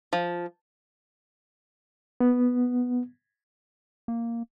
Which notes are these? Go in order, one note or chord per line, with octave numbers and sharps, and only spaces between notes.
F3
B3
A#3